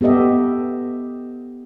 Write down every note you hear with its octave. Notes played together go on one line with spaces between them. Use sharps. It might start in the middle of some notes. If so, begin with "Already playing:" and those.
B3 G4 A4 D#5 E5